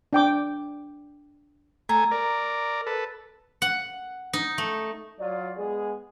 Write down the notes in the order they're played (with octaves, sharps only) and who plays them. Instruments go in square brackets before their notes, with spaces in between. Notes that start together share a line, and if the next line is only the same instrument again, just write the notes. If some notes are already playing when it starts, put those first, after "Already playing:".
[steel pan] D4 G5 D6
[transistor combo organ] A3 G#5 [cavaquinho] A#5
[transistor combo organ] A#4 D5
A4 B4
[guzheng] F#5
D#4
A3
[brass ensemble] F#3 F4 D5
G#3 B3 G#4